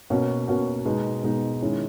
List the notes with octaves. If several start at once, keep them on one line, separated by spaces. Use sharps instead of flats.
B2 A#3 C#4 F#4
B2 A#3 C#4 F#4
B2 G#3 B3 D#4
B2 G#3 B3 D#4
D#3 G#3 C#4 E4